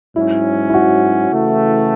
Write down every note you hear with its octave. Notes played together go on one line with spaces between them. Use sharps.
G#2 F#3 C#4 E4
E4
F#4
C#3 E3 A3